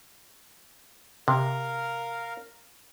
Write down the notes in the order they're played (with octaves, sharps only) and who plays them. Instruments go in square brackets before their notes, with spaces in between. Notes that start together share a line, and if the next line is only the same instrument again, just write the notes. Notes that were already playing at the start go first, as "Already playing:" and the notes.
[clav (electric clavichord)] C3 [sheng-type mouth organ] A#4 F5